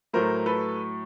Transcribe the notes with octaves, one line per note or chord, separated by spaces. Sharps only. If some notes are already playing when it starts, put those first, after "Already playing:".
A2 F#3 A3 A#4 C5
A4 B4